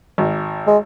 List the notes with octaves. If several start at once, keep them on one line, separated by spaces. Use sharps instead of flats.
G#1
G#3